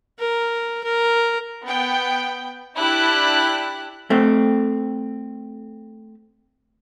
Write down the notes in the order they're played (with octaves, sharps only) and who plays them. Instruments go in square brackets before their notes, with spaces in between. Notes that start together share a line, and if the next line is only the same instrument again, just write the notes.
[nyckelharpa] A#4
A#4
[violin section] B3 G5
D4 E4 G4 F#6
[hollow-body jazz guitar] A3 C4